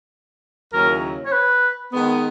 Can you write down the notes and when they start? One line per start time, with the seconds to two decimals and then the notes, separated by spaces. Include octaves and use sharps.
0.72 D#2 C#3 F#3 C#4 E4 A#4
1.25 C#5
1.32 B4
1.92 D#3 G#3 B3